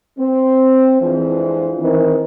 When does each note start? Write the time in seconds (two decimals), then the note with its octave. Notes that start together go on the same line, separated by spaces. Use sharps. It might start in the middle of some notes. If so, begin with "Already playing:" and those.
0.18 C4
1.01 F2 E3 F3 G#3 D4 C5
1.79 D#3 E3 C4